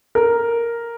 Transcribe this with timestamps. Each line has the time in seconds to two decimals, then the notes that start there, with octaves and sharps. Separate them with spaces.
0.15 A#4